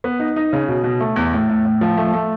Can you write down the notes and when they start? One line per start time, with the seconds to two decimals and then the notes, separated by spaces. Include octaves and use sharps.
0.04 B3
0.20 D#4
0.36 D#4
0.53 C#3
0.68 B2
0.84 B2
1.00 A3
1.16 E2
1.33 A2
1.49 A2
1.65 A2
1.81 F3
1.98 A3
2.14 A3